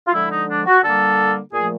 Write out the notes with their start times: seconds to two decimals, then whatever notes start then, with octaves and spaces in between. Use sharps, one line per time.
0.07 F4
0.13 D3 F3 G#3 E4
0.31 D#4
0.48 D4
0.66 F#4
0.83 D3 G3 A#3 A4
1.53 A#2 F3 A3 G#4